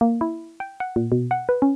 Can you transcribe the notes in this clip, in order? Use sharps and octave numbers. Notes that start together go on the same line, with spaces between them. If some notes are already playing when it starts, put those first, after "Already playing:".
A#3
E4
G5
F#5
A#2
B2
F#5
B4
C#4